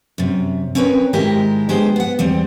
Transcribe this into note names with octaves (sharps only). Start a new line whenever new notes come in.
F#2 C3
C4 C#4 A#4 B4 C#5
G#2 D#3 G#3 E4 G4 A#4
G#3 B3 D4 G4 G#4 C5
B3 F#5
E2 G3 C4